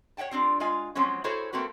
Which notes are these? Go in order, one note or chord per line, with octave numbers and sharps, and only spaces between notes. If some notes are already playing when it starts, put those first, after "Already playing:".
C#5 E5 F#5 G5 A5
G3 C4 D4 F4
G#3 F4 F5 G#5
F3 F#3 G#3 C4 C#4
E4 F#4 G#4 A4 C5 C#5
A3 A#3 C4 F#4 B4